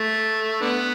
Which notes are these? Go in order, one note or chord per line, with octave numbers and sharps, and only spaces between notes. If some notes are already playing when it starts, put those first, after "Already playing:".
Already playing: A3
D3 B3